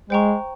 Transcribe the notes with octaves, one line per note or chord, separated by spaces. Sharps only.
G#3 C5 G5 A#5 C#6